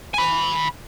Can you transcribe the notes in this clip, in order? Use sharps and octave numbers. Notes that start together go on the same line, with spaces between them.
G#5 B5